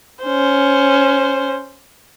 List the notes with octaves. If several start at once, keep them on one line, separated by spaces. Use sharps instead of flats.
C#4 C5